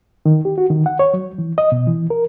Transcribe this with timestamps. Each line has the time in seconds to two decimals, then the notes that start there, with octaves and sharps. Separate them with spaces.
0.26 D#3
0.45 G4
0.58 F#4
0.70 D#3
0.86 F#5
0.99 C#5
1.14 F#3
1.38 E3
1.58 D#5
1.72 B2
1.87 E3
2.10 A#4